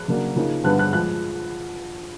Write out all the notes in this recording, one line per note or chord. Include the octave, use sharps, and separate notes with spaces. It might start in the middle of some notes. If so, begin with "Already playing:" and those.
Already playing: F#6
C#3 F#3 A#3 D4
C#3 F3 A#3 D#4
G2 D3 G3 B3 F#6
F#6
F3 G#3 F#6